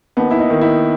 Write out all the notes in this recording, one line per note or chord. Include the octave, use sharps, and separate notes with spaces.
D#2 B3
E4
D#4
D#3
E4